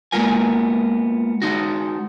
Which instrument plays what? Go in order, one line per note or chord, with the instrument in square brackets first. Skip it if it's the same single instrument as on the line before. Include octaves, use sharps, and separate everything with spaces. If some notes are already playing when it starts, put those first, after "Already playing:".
[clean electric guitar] G#3 A#3 B3 F4 A#4 G#5
G#3 D#4 F#4